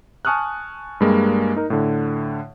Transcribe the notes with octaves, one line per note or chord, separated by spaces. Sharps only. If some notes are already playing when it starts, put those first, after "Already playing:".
G#5 A5 C#6 D#6 F6 F#6
G2 G3 G#3 A#3
D#4 A#4
A2 D3